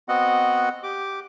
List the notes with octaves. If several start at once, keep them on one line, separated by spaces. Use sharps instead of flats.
B3 C4 F#4 D#5 F#5
G4 D6